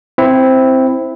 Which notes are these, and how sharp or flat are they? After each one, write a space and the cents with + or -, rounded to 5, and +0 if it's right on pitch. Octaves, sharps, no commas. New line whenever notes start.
C4 +0 E4 +0